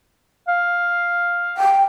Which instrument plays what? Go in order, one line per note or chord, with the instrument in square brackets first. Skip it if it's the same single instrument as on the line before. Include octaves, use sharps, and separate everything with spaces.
[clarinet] F5
[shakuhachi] G5